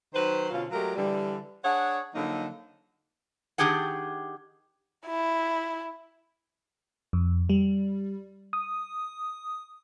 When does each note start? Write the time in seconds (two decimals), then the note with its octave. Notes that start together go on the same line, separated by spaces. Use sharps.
0.14 D#3 F#3 B4 C5
0.51 B2 D3 C#4 F4
0.71 F#3 G#3 A3 G4 A#4
0.96 D3 E3 G3
1.63 D4 G#4 C#5 F#5
2.14 D3 F3 F#3 A#3 D#4
3.58 D#3 F3 D4 G4 G#4 F#5
5.06 E4
7.13 F2
7.49 G3
8.53 D#6